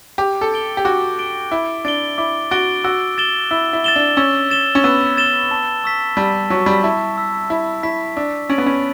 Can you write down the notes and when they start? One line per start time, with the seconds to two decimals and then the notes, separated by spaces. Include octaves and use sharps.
0.18 G4 D6
0.41 A4
0.52 A6 D7 G7
0.77 G4
0.85 F#4 D6
1.18 A6 D7 G7
1.51 E4 D6
1.85 D4 A6 D7 G7
2.18 E4 D6
2.51 F#4 A6 D7 G7
2.84 F#4 E6
3.18 A6 E7 G7
3.51 E4 E6
3.73 E4
3.84 A6 E7 G7
3.96 D4
4.17 C#4 E6
4.51 A6 E7 G7
4.75 C#4
4.84 B3 E6
5.17 A6 E7 G7
5.51 A5
5.84 C#6 E6 B6
6.17 G3 A5
6.50 F#3 C#6 E6 B6
6.66 G3
6.83 E4 A5
7.17 C#6 E6 B6
7.50 E4 A5
7.83 E4 C#6 E6 B6
8.17 D4 E6
8.49 C#4 A6 D7 F#7
8.58 B3
8.66 C#4